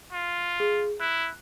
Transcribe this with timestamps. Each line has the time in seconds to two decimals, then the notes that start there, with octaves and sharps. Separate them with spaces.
0.13 F4
0.60 G#4
1.00 E4 F#6